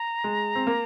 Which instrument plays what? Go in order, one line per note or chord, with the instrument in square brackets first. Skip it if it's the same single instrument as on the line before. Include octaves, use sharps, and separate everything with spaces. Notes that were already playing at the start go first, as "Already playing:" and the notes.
Already playing: [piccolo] A#5
[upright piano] G#3
C4
A#3